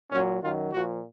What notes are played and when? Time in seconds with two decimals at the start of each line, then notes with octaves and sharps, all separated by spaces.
0.11 A#2 F#3 C#4
0.42 F#2 D#3 F#3 F4
0.72 A#2 F3 F#4